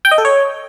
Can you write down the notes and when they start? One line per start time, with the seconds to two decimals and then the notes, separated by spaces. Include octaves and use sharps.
0.05 G5
0.11 D#5
0.18 A4
0.25 C#5